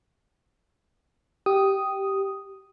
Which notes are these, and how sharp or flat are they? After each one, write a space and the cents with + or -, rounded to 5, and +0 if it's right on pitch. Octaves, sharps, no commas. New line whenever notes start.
G4 -10 D#6 +0